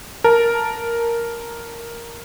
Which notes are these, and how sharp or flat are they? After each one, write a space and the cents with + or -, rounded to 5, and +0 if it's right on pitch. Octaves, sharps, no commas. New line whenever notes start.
A#4 +0 A5 +0